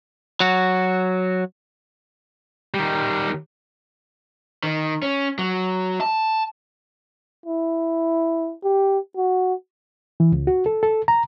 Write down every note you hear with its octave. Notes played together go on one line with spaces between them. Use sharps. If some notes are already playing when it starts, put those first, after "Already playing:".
F#3 F#4
D#3 G3
D#3
C#4
F#3
A5
E4
G4
F#4
E3
C#2
F#4
A4
A4
A#5